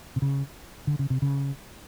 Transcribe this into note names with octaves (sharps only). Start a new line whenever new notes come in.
C3
C#3
D3
C#3
C3
C#3